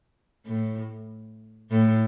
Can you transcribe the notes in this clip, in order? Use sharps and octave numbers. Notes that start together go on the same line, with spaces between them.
A2
A2